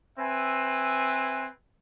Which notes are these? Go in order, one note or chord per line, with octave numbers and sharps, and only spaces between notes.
C4 B4 E5 G#5